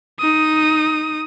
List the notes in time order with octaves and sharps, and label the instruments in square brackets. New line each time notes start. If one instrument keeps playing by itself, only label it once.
[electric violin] D#4 D#6